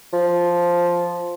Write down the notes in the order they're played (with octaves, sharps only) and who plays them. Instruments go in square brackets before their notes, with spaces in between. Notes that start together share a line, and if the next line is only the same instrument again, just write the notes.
[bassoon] F3